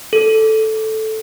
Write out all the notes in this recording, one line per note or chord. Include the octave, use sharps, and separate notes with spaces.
A4